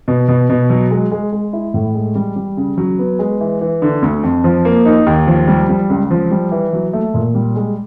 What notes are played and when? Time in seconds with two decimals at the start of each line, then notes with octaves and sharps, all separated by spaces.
0.08 B2
0.28 B2
0.50 B2
0.70 F#3
0.91 G#3
1.11 G#3
1.32 G#3
1.53 E4
1.74 A2
1.95 G#3
2.15 G3
2.36 G3
2.57 C#3
2.78 F#3
2.98 B3
3.19 G#3
3.41 E3
3.61 E3
3.82 D3
4.02 D2
4.23 F2
4.44 F3
4.65 A#3
4.86 D#4
5.06 D#2
5.27 F3
5.48 G3
5.69 G3
5.90 C#2
6.10 F3
6.31 G3
6.52 E3
6.73 F#3
6.93 A3
7.14 A#2
7.35 G3
7.56 G#3